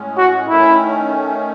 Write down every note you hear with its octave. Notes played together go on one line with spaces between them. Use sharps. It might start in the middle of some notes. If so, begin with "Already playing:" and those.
Already playing: A2 G#3 C#4
F#4
D#3 A3 C#4 E4